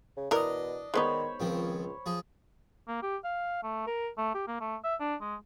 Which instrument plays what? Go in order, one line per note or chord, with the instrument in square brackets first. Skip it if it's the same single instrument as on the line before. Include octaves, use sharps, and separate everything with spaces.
[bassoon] C#3
[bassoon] B2 [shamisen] E3 A#4 [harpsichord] D4 D#5
[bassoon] D#3 [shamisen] G#3 B3 D#4 [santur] C5 C#5 B5
[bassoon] C#2 [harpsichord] D#3 F3 C4
[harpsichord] F3 G#4
[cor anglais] A#3
G4
F5
A3
A#4
A3
G4
A#3
A3
E5
D4
G#3